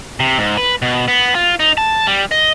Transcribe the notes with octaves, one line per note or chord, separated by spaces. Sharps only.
C3
G#2
B4
B2
B3
F4
D#4
A5
G3
D#5